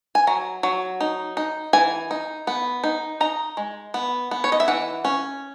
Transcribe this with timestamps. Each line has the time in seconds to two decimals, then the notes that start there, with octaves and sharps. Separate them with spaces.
0.15 G#5
0.27 F#3 A#5
0.63 F#3
1.01 D#4
1.37 D#4
1.73 E3 G#5
2.11 D#4
2.47 B3
2.84 D#4
3.21 D#4 A#5
3.57 G#3
3.94 B3
4.31 B3
4.44 C#5
4.52 D#5
4.60 E5
4.68 E3 F#5
5.05 C#4